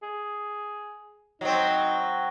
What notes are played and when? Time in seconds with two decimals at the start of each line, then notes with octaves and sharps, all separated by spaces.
0.03 G#4
1.41 F#3 C4 D#4